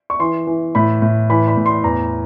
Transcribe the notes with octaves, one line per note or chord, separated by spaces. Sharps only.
C#6
E3 C6
E3
A2 B5
A2
E3 B5
B5
A2
C6
E2 A#5